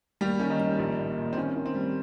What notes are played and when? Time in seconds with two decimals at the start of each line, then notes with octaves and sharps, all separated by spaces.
0.21 D#2 G3 G4
0.39 D#3 C#4
0.50 D#3 D#4
0.60 G3
0.79 A#1
0.98 A#1
1.17 A#2
1.33 C4
1.37 D#3 C#4
1.56 D#3
1.66 C4
1.75 G3